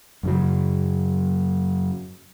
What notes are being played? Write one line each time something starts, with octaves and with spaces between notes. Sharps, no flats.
F#2 C#3 F#3